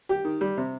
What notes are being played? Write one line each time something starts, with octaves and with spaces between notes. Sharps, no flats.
G4
D#3
G3
C3